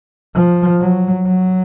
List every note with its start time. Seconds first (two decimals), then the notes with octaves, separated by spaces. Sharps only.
0.35 F3
0.80 F#3
1.26 F#3